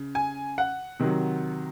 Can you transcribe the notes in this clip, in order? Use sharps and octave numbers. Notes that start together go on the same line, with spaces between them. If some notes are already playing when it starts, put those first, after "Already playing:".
Already playing: C#3
G#5
F#5
C3 D#3 F#3